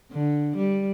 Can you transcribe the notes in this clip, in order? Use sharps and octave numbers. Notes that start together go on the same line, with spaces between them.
D3
G3